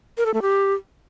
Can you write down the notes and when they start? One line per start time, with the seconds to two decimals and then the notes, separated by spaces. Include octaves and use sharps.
0.18 A#4
0.26 A4
0.34 A3
0.42 G4